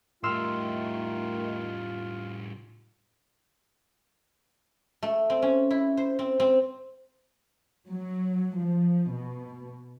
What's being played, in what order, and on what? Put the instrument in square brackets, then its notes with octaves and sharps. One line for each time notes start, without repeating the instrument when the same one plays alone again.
[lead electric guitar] A2 G3 [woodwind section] D#3 A3 [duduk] F4 [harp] C6 E6 F6
[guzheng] A3
C4
C#4
E4
C5
C4
C4
[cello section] F#3
F3
B2